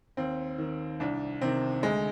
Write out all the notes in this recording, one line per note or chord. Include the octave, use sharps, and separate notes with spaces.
D#2 C4
D#3
C2 D4
C3 D#3 C4
D2 G#3